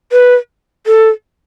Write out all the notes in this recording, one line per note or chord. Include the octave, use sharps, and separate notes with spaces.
B4
A4